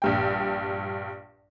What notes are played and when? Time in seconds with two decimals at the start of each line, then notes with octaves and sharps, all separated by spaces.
0.02 A#1 G2 G5